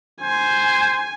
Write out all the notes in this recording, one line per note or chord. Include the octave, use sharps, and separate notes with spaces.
C5 G#5